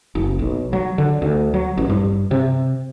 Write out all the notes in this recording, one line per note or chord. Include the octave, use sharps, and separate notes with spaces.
F#1
B1
F#3
D3
D2
F#3
A1
G2
C3